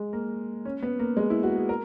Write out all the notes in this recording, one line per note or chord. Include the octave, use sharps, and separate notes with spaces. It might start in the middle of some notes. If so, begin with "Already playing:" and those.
Already playing: G#3
A#3
C#4
B3
A#3
G#3
E4
F#4
G#4
A#4